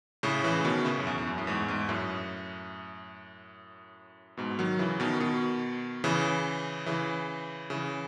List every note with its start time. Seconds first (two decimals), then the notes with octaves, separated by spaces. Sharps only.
0.23 A2 C#3
0.44 C#3 E3
0.64 B2 D#3
0.85 A2 C#3
0.99 F#2
1.07 E2
1.18 E2
1.27 F#2
1.38 A2
1.47 E2 G#2
1.68 E2 G#2
1.89 F#2 A2
4.37 G#2 B2
4.59 D#3 F#3
4.79 C#3 E3
5.00 B2 D#3
5.20 B2 D#3
6.04 C#3 E3
6.86 C#3 E3
7.70 C#3 E3